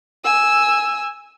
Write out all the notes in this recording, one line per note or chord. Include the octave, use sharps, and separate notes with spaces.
G#5 E6